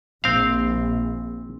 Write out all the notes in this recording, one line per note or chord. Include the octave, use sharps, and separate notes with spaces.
A#1 C4 F5